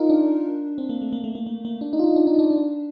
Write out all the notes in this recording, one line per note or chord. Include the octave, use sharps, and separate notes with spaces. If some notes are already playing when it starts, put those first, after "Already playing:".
Already playing: D#4 F4 A#4
D4
C4
A#3
A3
A#3
A3
A#3
A#3
A#3
D4
D#4
F4
D#4
D4
D#4
D4
D4